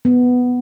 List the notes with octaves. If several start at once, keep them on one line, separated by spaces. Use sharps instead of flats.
B3